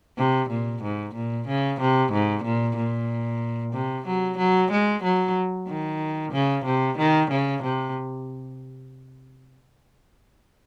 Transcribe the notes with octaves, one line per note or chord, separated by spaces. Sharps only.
C3
A#2
G#2
A#2
C#3
C3
G#2
A#2
A#2
C3
F#3
F#3
G#3
F#3
D#3
C#3
C3
D#3
C#3
C3